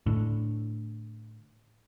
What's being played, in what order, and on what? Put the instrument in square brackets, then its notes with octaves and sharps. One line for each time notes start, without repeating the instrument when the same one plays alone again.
[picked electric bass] A2 D3